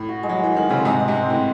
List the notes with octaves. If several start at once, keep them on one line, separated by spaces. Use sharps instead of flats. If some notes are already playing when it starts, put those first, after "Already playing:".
Already playing: A2
F#4
G#3
F#3
E3 G#3
D#3 G#3
C#3 C4
G#2 C3 G#3
G#3
G#2 C3
C4
G#2
A2 C4